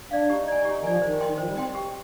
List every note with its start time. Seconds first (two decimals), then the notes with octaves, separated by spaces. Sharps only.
0.11 D4 D5 F5
0.29 D#4 G4
0.48 D5 G#5
0.65 D#4 G4
0.80 D#3
0.84 F3 D5 G#5
1.02 D#3 C5
1.21 D#5 G5 C6
1.38 F3 C5
1.47 G3
1.57 C4 D#5 G5 C6
1.75 G4